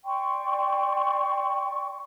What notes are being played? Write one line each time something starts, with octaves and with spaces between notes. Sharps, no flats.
D5 G5 C6 C#6